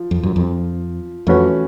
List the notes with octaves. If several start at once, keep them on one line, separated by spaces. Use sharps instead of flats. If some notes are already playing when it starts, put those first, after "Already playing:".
Already playing: F3
F2
F#2
F2
F2 E3 A3 C#4 F#4 B4